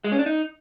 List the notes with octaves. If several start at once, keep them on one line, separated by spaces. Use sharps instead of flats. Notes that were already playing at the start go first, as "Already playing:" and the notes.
G#3
C#4
D4
D#4